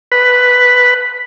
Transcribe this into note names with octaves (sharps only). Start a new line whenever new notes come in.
B4